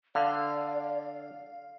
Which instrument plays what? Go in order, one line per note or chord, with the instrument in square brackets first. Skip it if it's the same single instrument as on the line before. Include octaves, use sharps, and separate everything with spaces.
[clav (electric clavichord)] D3 [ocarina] D5 [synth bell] F5